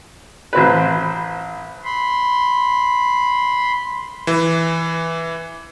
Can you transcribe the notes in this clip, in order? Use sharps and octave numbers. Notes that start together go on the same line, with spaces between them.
A1 C4 B4
B5 C6
E3